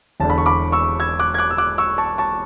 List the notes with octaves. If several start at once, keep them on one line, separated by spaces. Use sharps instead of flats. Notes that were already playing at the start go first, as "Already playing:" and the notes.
E1 E2 D3 A5
B5
C#6
B5 D6
C#6 E6
E6 G#6
D6 F#6
G#6
D6 F#6
E6
D6 F#6
C#6 E6
A5 C#6
A5 C#6